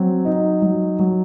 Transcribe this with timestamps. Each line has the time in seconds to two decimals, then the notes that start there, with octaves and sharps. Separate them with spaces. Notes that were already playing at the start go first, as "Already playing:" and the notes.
Already playing: F#3 C4
0.25 D#4
0.62 F#3
0.99 F#3